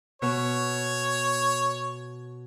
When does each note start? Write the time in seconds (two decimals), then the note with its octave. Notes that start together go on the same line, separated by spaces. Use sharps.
0.22 B2 C#5